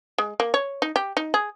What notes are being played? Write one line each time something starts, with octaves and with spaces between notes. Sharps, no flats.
G#3
A#3
C#5
D#4
G4
D#4
G#4